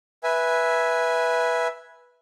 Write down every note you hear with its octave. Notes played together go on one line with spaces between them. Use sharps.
B4 E5 G#5